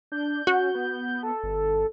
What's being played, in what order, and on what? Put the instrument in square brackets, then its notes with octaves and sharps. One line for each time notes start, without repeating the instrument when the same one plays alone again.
[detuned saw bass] D4 [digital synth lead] G6
[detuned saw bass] C#4 [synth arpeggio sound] F#4
[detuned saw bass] B3
[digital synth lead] A4
[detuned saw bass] G1